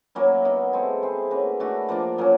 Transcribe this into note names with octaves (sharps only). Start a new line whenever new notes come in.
F#3 A#3 C#4 E4
B3 D#4 F#4
G#3 C4 E4 A4
C4 E4 G#4
A#3 C#4 F#4 B4
A3 D4 F#4
F3 A#3 D4
A#2 F#3 A#3 C#4